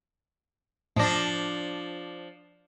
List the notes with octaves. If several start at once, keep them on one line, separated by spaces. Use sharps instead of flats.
A2 F3 D4 A#6